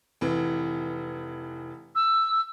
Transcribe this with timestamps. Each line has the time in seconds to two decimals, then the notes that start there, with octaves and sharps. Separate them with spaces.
0.21 F1 E3
1.95 E6